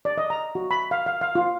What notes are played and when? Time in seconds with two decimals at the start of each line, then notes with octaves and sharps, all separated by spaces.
0.05 D5
0.18 D#5
0.30 A#5
0.55 F#4
0.71 B5
0.91 F5
1.06 F5
1.21 F5
1.35 F4